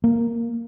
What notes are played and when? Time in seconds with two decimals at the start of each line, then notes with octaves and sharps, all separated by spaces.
0.04 A#3